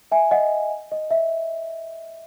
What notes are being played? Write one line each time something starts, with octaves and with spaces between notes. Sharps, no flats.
E5 G#5
D#5 F#5
D#5
E5